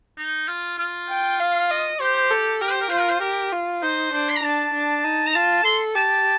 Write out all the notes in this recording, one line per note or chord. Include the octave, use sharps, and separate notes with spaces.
D#4
F4
F4
G5
F5
D#5
G4 C5
A4
G4 A#4
C5
A#4
F4 C5
A#4
C5
G4 A#4
F4
D#4 C5
D4 C5
C6
A#5
D4 A5
D4
D#4
A#5
F4 A5
A4 C6
G4 A5